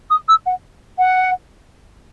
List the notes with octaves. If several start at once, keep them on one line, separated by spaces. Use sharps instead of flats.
D#6
E6
F#5
F#5